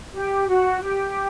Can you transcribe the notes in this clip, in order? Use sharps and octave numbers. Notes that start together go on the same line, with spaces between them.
G4
F#4
G4